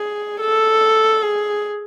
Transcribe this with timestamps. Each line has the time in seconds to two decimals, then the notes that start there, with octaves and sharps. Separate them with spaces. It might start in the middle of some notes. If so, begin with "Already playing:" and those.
Already playing: G#4
0.40 A4
1.23 G#4